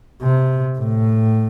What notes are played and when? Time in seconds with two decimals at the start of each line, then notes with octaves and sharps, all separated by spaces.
0.22 C3
0.79 A2